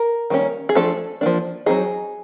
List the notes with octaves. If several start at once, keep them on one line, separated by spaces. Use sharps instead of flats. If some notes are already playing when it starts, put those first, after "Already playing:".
Already playing: A#4
D#3 G3 A#3 C#4
G#4
F3 A3 D4 A4
F3 A#3 D4
F#3 A3 C4 D#4 G#4